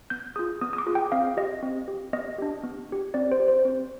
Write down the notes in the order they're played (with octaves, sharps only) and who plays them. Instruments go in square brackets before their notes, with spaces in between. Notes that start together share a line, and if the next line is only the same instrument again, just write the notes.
[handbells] B3 G6
F4 G#4 D#6
B3 D#6
D#6
D6
F4 G#4
G5
C4 F5
G4 D#5
C4
G4
B3 D#5
D4 G4
B3
D4 G4
C4 D5
C5
G4
C5
C4